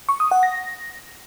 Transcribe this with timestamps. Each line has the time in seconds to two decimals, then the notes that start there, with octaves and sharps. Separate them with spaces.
0.09 C#6
0.20 D#6
0.31 F#5
0.43 A#6